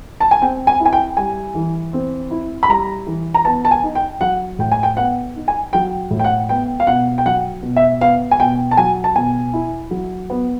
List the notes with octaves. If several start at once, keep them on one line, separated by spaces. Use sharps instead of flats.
A5
G#5
C4 G5
G#5
E4
G#5
G5
G3 G#5
E3
C4
E4
B5
G3 A#5
E3
A#5
B3 A5
A5
G#5
D#4
G5
F#3 F#5
A2 G5
G#5
G5
B3 F#5
D#4
G#5
F#3 G5
A2
G5
F#5
B3 G5
F5
B2 F#5
G5
F#3 F#5
B2
E5
B3 F5
G#5
B2 G5
A5
F#3 G#5
A5
B2 G#5
E4
F#3
B3